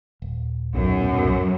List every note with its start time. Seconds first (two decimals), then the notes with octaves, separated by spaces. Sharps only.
0.22 D#1
0.74 B1 F#2